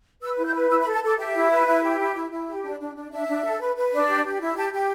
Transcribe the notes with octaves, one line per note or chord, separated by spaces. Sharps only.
B4 E6
E4
G6
B4
E4 E6
B5
A4
A5
A4 D6
G4 E5
E4
B4
E4
G4
E4
E4
E4
G4
D4
D4
D4
D4 E5
D4
A4
B4
B4
D4
G4
G4
E4
G4 A5
G4